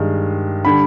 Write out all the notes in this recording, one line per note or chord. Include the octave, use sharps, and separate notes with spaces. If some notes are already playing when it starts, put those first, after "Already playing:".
Already playing: G2 D#3 G#3
D3 G3 B5